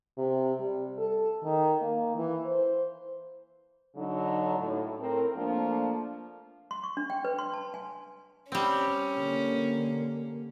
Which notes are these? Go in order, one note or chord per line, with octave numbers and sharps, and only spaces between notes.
C3
G3
A4
D#3
A#3
E3
C5
D3 F#3 D#4
A2
A2 C4 A#4
F3 A3 A#3 D4
C6
C#6
D4
G5
B4
C6
A5
G#5
G3 C4 C#4
D3 A#3